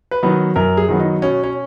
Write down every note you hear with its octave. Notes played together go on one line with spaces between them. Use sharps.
B4
D#3 F#3 B3
F#2 A#4
G#4
D#3 F#3 B3
D#4
B2 C#4
C#4